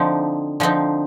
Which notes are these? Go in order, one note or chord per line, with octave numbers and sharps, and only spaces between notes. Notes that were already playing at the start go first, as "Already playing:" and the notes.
Already playing: D3 F3 C4 D#4
D3 F3 C4 D#4